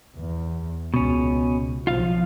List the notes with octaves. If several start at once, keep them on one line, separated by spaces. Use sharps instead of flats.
E2
C#2 B2 C#4
B1 F3 F4 F5